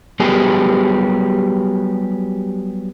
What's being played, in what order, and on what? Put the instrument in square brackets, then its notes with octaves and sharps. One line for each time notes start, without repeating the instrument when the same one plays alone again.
[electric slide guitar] F#3 G3 B3 G4 G#4